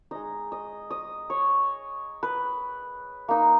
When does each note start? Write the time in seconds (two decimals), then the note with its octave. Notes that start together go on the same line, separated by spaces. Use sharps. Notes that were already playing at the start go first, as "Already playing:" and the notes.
0.11 G#3 D#4 D#5
0.52 D#5
0.91 D#5
1.30 C#5
2.23 B4
3.28 A#3 D#4